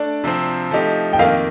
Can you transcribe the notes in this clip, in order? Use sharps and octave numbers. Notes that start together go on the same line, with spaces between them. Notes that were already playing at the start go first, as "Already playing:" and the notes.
Already playing: A3 D4 D5
C3 F3 C4
F3 A3 D#4 G4
G5
F2 D#3 A#3 F5